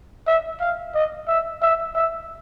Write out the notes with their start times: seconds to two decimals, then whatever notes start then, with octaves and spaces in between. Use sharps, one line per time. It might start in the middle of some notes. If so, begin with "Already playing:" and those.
0.27 E5
0.60 F5
0.95 D#5
1.28 E5
1.62 E5
1.95 E5